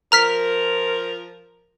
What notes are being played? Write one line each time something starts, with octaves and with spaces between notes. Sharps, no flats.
F3 A#4 A#5 F6 B6